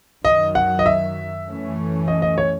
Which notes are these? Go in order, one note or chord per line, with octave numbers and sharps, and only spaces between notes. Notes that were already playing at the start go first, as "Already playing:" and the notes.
F#2 D#3 F#3 D#5
F#5
D#5
E5
F#2 E3 A3 C#4
D#5
D#5
C#5